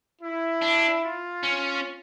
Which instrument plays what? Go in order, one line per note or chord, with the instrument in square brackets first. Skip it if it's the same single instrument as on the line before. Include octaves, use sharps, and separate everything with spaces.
[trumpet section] E4
[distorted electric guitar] D4
[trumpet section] F4
[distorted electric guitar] C#4